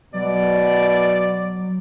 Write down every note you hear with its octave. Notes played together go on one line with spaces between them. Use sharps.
B2 F#3 D5